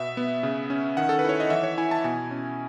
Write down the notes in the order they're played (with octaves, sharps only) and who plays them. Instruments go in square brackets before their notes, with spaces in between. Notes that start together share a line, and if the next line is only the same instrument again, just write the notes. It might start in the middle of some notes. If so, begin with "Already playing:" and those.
Already playing: [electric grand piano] B2 B3 E5
B3
C#3
C#4
D#3 F#5
A4
B4
E4 C#5
D#5
E3 E5
C#5
E4 G#5
A5
B2 G#5
C#4